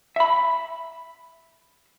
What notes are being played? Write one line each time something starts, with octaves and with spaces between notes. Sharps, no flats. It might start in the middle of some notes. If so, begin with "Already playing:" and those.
E5 B5